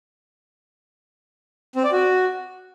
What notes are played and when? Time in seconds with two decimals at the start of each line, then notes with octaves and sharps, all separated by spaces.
1.76 C4
1.84 D5
1.92 F#4